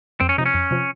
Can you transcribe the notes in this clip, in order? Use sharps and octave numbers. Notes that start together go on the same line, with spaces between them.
F2 C4
C#4
C3 F3 D#4
C#4
F2
C3 F3